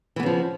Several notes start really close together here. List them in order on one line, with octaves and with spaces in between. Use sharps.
E3 B3 C#3 F3